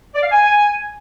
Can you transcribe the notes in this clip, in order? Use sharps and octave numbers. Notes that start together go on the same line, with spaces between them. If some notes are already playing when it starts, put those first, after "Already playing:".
D5
F5
G#5